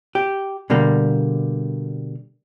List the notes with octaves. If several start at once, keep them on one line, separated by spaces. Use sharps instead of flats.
G4
B2 D3 G3 A#3